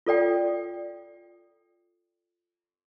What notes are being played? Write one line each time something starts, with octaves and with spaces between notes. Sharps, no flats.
F4 A4 D5 G5